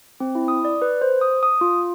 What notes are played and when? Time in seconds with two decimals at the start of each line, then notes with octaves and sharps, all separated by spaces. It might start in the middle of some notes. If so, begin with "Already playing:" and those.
0.20 C4
0.35 E4
0.48 D#6
0.65 D5
0.82 B4
1.01 C5
1.21 D#6
1.43 D#6
1.61 F4